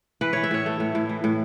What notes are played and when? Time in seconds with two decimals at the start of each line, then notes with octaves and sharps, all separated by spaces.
0.21 E3 B4
0.33 E3 C#5
0.44 E5
0.51 A2 C#5
0.66 A3
0.80 A2
0.95 A2
1.09 E3
1.24 A2